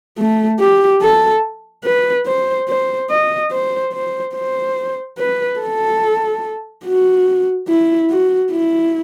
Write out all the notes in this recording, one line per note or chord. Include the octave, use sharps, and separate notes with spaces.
A3
G4
A4
B4
C5
C5
D#5
C5
C5
C5
B4
A4
F#4
E4
F#4
E4